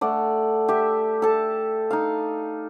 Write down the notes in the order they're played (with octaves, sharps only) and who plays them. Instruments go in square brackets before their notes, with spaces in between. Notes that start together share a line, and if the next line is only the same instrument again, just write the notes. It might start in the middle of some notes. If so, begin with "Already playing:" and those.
[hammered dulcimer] A3 D5 F#5
G4 E5
A4 A5
D#4 F5